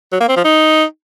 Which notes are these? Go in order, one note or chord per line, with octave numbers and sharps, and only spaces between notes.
F#3
A#3
C4
F3
D#4